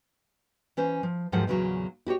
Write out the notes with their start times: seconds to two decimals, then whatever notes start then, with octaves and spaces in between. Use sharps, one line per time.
0.77 E3 C#4 C5
1.03 F3
1.32 D#2 G#2 F3 F#3 F#5
1.47 E2 A#2 C#3 F3 F#3
2.07 E4 F#4 G4 C#5